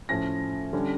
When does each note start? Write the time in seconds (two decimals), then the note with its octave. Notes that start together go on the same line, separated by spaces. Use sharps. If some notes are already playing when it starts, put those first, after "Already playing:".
0.09 A2 F3 C#4 A#6
0.73 D3 G3 C#4